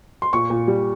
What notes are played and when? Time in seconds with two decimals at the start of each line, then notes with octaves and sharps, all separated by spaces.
0.22 C6
0.33 A#2 C#6
0.50 A#2
0.68 G3